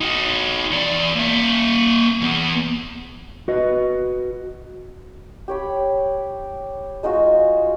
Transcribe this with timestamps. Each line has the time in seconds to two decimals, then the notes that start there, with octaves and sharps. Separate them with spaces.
0.01 D#4 F#4
0.71 E2 D5
1.16 A#3 E5
2.21 E3 B3
3.48 F#4 B4 D#5
5.48 G4 C#5 B5
7.03 G#3 D#4 F4 F#4